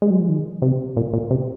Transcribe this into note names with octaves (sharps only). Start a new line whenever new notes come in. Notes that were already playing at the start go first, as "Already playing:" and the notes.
G#3
F#3
F3
D#3
C3
A#2
A#2
C3